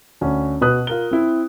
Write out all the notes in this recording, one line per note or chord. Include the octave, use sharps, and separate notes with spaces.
D2 C#4
B2 B4 D#6 F#6
F4 A#4 G7
C4 E4